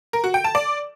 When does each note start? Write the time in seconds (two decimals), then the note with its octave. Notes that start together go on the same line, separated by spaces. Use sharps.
0.13 A#4
0.24 F#4
0.34 G5
0.44 A5
0.55 D5